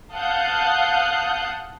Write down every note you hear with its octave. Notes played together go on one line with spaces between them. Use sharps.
F5 F#5 A5 D#6 F#6 G6